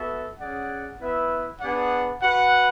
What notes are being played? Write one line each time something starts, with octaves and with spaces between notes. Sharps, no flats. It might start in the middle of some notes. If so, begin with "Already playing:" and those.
Already playing: B3 F#4 A4 E5
C#4 G#4 D5 F#5
B3 E4 B4 E5
B3 D4 G#4 D5 F#5
F#4 B4 F#5